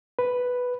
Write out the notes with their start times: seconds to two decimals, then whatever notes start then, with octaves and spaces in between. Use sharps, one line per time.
0.19 B4